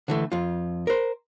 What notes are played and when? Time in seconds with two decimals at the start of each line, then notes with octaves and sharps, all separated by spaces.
0.08 D3 E3 A3
0.32 F2 F4
0.87 A#4 C5